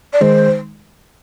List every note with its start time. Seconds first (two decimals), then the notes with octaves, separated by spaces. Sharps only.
0.13 D5
0.21 D#3 G#3 D#4 C5